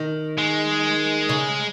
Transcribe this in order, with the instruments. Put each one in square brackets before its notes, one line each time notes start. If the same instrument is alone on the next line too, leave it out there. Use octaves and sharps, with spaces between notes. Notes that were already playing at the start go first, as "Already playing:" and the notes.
Already playing: [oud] D#3
[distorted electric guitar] G#3
[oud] C#3